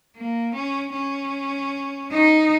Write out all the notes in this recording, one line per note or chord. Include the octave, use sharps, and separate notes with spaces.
A#3
C#4
C#4
D#4